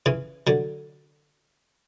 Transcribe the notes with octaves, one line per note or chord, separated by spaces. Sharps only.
C#3 E3
D3 F#3